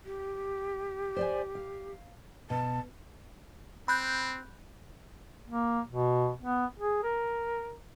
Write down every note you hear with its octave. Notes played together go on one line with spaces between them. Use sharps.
G4
C5 D5 G#5
F5
B2 A5
C4 B5 F#6 G6
A#3
B2
B3
G#4
A#4